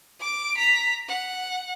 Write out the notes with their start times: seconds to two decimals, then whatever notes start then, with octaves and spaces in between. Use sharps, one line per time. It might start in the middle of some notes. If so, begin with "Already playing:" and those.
0.20 D6 D7
0.57 A#5 B6
1.08 F#5